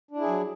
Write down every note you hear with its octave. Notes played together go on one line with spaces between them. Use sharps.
F#3 D4 E4 G#4